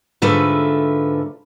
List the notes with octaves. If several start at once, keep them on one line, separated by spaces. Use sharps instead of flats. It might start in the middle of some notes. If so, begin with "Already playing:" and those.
G#2 D3 A3 F4 B4 E5